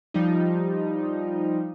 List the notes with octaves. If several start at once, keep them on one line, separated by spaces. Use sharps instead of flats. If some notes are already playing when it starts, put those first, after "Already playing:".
F3 G3 D#4